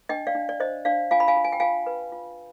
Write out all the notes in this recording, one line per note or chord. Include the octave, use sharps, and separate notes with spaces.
D4 D#5 G5
D5 F5
D4
D5
C5 D#5
D4 D5 F5
F4 F5 G#5
B5
F5 G#5
F4
G#5
G5
F4 F5 G#5
B4
F4